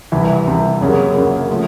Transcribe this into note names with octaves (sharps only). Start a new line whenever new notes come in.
C2 C3 E3
C2 C3 E3
F#2 C#3 F#3 A#3
F#2 C#3 F#3 A#3
F3 A3